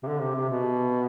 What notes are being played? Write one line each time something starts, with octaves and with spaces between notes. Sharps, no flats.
C3
D3
C3
C3
B2